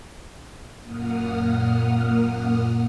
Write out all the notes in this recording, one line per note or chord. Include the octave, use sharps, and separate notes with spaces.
F#2 A#2 A#3 F#5 D#6 F6